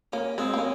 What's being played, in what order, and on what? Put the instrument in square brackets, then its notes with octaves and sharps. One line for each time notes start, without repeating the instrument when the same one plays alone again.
[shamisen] A#3 [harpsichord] C#4
[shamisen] G#3 [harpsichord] C4
[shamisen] A#3 [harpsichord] C#4